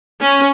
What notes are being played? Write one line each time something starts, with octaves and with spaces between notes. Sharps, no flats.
C#4